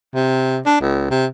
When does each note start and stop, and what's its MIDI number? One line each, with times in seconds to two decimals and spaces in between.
0.14 0.59 48
0.66 0.79 62
0.81 1.10 37
1.11 1.26 48